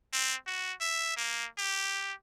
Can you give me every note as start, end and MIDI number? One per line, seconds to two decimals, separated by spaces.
0.13 0.35 60
0.47 0.73 66
0.81 1.13 76
1.17 1.46 58
1.58 2.13 67